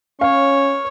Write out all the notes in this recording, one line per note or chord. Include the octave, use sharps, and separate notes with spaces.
C#4 C#5 F5